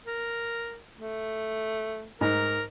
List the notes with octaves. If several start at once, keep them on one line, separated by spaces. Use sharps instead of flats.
A#4
A3
G#2 A#4